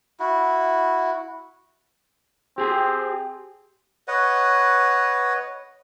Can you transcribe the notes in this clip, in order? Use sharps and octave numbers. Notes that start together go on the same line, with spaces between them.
E4 F#4
C4 G4 G#4
B4 C#5 D#5 F#5